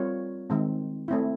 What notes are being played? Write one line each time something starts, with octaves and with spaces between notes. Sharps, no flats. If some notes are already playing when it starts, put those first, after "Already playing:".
Already playing: G3 C4 F4 A#4 C#5
D#3 G#3 C4
A3 C4 E4